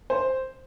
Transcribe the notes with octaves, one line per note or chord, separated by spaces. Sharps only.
C5